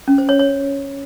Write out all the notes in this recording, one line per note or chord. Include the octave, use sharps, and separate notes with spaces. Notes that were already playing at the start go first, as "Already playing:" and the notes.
C#4
C5
C#5
C#5